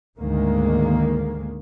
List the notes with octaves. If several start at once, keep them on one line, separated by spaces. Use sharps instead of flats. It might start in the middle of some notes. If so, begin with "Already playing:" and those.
D2 G#2 D#3 G#3 A#3